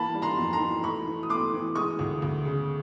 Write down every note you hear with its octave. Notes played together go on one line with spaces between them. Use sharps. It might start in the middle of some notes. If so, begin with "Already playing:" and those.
Already playing: E3 A#3 A5 B5
G3
A#5 C6
F2
A#5 C6
E3
A3 B5 C#6
E3
D#6
A3 C6 D6
E3
G#3 C#6 D#6
D2
D2
C#3